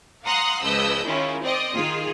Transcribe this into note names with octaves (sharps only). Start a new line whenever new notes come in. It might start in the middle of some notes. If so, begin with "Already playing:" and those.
F5 F#5 A#5 C6 D#6 F#6
C#2 F3 B4 D#5 E6 G6
D#3 G#3 C#4 E4 F4
C4 D5 D#5
D#3 F4 G#4